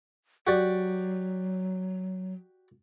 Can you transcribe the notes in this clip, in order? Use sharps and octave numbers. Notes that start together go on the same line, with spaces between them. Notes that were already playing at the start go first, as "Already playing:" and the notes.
F#3 F#4 G4 D5